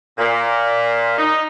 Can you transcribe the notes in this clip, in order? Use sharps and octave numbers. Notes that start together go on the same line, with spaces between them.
A#2
D#4